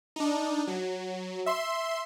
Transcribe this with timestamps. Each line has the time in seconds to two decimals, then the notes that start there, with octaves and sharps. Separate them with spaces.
0.16 D4 D#4
0.67 F#3
1.46 E5 C6